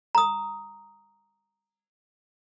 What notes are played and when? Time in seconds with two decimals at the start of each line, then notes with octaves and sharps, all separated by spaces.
0.15 A#5 D#6